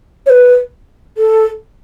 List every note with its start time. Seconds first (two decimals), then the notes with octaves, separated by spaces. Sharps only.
0.26 C#5
0.30 B4
1.18 A4